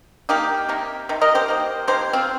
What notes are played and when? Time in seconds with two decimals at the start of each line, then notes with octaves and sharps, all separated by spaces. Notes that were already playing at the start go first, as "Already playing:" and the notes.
0.29 D#3 A#3 D#4 G4
0.69 C3 D#3 A#3
1.09 C3 D#3
1.21 A#4 D#5
1.35 G4 C5
1.48 D#3 A#3
1.87 D#3 A#3 G4 C5
2.13 C4 F4